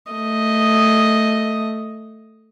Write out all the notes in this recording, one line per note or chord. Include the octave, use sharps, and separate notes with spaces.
A3 D#5